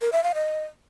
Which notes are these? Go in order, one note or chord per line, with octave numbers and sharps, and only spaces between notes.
A#4
E5
F5
D#5